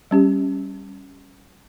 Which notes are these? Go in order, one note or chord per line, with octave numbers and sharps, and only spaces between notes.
G3 C#4 G4